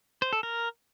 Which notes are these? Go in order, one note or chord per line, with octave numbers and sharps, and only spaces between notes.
C5
A4
A#4